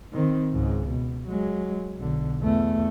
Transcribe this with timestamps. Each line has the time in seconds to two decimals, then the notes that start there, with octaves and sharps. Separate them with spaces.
0.13 D#3 C4
0.52 C#2 G#2
0.88 B2
1.27 F#3 G#3
1.97 B1 D3
2.40 E2 A3